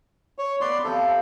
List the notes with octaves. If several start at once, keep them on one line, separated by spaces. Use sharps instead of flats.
C#5
B3 B4 D5 C6
C3 F3 G4 A4